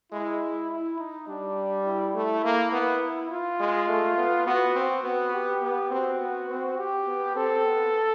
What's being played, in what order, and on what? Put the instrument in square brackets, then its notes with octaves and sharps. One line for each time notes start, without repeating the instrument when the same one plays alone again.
[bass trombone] G#3 [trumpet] E4
[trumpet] E4
D#4
[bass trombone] G3 [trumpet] D4
[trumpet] E4
[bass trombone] A3 [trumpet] E4
[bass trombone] A#3
B3
[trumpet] F4
[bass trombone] G#3
A3
B3
[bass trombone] B3 [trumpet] F#4
[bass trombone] C4
[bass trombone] B3 [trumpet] F#4
[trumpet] G4
[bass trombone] B3
[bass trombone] C4 [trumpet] F#4
[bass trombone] B3
C4
[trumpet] G4
[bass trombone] B3
[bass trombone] C4 [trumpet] A4
[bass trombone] B3